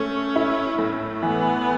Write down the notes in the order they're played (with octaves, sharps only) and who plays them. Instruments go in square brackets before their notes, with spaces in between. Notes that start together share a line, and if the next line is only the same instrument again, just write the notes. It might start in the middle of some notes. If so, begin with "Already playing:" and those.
Already playing: [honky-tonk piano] A3 [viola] C#4
[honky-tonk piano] E4
[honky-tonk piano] A2 [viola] A3
[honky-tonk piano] E3 [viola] B3